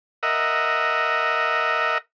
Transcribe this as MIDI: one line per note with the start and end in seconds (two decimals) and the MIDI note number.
0.23 1.98 70
0.23 1.98 75
0.23 1.98 76
0.23 1.98 78